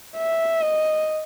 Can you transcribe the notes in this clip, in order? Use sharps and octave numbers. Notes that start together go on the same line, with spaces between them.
E5
D#5